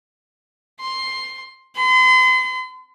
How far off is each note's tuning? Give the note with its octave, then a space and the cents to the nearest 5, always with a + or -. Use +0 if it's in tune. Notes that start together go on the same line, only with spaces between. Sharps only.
C6 +10
C6 -40